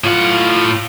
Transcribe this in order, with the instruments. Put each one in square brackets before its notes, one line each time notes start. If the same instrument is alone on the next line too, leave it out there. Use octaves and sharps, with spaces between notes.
[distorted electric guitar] A2 F#5 [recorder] F4